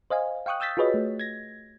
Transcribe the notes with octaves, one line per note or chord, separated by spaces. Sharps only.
C5 D#5 F5 G#5
F5 G5 C#6 D#6 F#6
D#6 E6 G6 A6 B6
F4 F#4 G#4 B4 C#5 D#5
A3
G#6 A#6